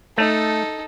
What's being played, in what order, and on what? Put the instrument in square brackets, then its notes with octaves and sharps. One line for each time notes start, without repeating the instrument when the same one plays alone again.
[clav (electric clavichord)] A3 [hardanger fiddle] D#4 A4